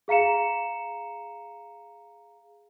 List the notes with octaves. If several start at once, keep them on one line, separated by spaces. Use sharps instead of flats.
G#4 F5 A#5 C#7 E7